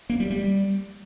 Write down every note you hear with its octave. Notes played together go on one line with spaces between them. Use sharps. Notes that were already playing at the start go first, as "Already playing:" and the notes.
A#3
G3
G3